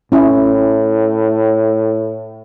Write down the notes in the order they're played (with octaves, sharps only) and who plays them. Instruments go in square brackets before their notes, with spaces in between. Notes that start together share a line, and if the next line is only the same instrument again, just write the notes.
[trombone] A2 [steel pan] C#4 E4